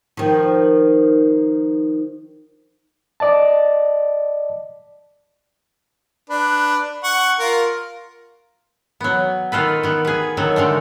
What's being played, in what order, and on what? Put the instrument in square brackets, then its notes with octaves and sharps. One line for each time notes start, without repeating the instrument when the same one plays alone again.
[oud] D#3 F3
[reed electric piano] D5 D#5 A5
[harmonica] D4 B4
F#5 C#6
F4 A#4
[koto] F#3 B3
D#3 F4 A4 B4
D#3 B3
G#4 B4
D#3 F#3 A4
D3 D#3 G#3 A3